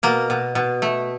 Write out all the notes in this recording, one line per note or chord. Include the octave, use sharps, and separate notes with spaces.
B2 A#3
B2
B2
A3